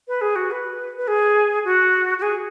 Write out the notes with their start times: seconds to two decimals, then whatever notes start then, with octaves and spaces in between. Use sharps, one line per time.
0.08 B4
0.21 G#4
0.36 F#4
0.51 B4
0.97 B4
1.08 G#4
1.65 F#4
2.18 F#4
2.22 G#4